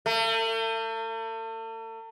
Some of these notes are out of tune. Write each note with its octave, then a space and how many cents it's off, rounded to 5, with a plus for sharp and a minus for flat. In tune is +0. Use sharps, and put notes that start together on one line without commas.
A3 +40